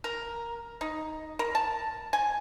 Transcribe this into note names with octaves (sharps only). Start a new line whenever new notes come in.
A#4
D#4
A#4
A5
G#5